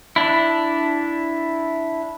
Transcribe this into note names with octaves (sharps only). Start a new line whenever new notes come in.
D4 E4